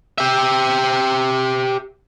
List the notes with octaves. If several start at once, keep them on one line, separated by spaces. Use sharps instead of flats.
G4 E5